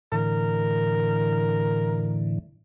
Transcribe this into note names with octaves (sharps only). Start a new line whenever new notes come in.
A2 D3 E3 A#4